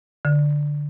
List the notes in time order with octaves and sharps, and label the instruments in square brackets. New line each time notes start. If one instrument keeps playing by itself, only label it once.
[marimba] D3